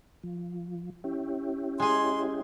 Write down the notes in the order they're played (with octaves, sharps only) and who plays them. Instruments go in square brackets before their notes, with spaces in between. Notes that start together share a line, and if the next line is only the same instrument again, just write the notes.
[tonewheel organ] F3
C#4 E4 G4
[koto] G#3 G#4 [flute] C6